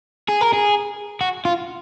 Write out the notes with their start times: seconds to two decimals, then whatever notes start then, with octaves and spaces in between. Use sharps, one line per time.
0.28 G#4
0.41 A#4
0.53 G#4
1.21 F#4
1.45 F4